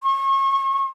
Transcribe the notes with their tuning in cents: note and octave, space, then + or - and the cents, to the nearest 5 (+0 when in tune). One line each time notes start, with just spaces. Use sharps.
C#6 -35